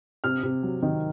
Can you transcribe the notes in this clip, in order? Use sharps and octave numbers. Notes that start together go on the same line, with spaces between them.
C3 F6
C3
F#3
D#3